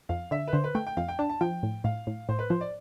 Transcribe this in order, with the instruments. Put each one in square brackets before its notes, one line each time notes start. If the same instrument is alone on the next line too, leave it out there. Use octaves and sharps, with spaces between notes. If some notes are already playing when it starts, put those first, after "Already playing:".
[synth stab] F2 [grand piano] F5
[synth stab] D3 [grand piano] E5
[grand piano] B4
[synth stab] D3 [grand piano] C5
[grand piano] B4
[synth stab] A3 [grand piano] G5
[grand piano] G5
[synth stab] F2 [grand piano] F5
[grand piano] G5
[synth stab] D4 [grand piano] A5
[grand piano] A5
[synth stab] F3 [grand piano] G5
[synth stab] A2
[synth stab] A2 [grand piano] F5
[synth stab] A2
[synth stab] A2 [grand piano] C5
[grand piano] B4
[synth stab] F3 [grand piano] C5
[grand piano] D5